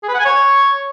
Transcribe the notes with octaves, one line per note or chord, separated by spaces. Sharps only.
G#4
B4
F#5
G#5
C#5